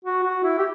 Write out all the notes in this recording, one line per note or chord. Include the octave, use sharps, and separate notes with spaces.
F#4
F#4
E4
G4